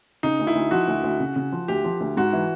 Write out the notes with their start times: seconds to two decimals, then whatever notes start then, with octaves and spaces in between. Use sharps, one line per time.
0.23 C#3 D#4
0.39 D2
0.47 E4
0.55 D2
0.71 F3 F#4
0.88 D2
1.04 D2
1.20 C#3
1.36 C#3
1.52 F3
1.68 D2 G4
1.84 F3
2.00 D2
2.17 G#2 F#4
2.33 E3